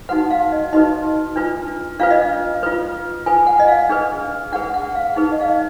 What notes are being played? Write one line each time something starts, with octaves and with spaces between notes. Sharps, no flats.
D#4 F#4 B4 F#5
F5
D#5
D#4 F#4 B4 D#5
D4 F4 B4
D4 F4 B4 F5
D#5
F5
F4 B4
F4 B4 G#5
F#5
D#5
F5
D4 G#4 B4
D4 G#4 B4 F#5
F#5
F5
D#4 G#4 B4
D#5
F5
D#5